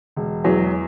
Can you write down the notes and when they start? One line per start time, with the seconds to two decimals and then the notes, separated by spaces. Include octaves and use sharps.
0.16 E1
0.44 E2 F#3